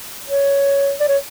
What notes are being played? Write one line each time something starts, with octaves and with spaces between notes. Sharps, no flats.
C#5
D5
C#5